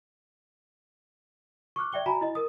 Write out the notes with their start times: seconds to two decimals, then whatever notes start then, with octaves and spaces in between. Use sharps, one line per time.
1.76 C#6 D6 F6 F#6
1.92 D5 E5 G5 G7
2.06 F#4 G#5 A#5 B5
2.21 E4 D#5
2.35 A#4 D#6